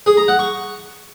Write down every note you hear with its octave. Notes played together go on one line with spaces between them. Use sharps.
G#4
A#5
F#5
C#6